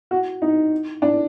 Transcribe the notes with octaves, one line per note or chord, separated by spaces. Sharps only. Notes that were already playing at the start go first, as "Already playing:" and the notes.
F#4
D#4
D4